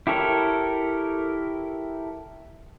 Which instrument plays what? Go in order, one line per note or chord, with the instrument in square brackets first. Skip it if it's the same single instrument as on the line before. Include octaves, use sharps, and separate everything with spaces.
[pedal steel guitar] E4 G4 A4 A#4 C#5